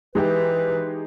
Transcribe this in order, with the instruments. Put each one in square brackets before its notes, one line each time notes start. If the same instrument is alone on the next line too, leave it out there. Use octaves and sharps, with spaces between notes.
[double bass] E3 [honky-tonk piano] G#3 D#4 G4 [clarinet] B4